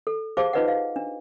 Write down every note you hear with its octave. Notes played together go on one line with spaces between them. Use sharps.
A4
G4 G#4 C5 F5 A5 D6
D#4 F4 B4 D5 D#5 F#5
F5
D4